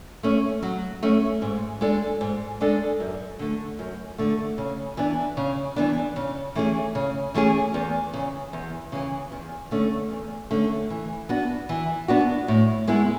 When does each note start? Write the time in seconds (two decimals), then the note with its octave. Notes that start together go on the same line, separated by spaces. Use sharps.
0.23 A3 C#4
0.63 F#3
1.03 A3 C#4
1.42 G#2
1.81 G#3 D4 A4 D5
2.21 G#2
2.61 G#3 D4 A4 D5
3.00 F#2
3.39 D3 A3
3.79 F#2
4.18 D3 A3
4.58 C#3
4.97 E3 B3 D4
5.37 C#3
5.76 E3 B3 D4
6.16 C#3
6.56 E3 A3 C#4 G#4
6.95 C#3
7.34 E3 A3 C#4 G#4
7.74 E2
8.13 C#3 E3
8.53 E2
8.92 C#3 E3
9.32 E2
9.71 D3 A3 C#4
10.11 E2
10.51 D3 A3 C#4
10.90 E3
11.29 B3 D4 F#4
11.69 E3
12.08 B3 D4 F#4
12.48 A2
12.88 G#3 B3 E4 G#4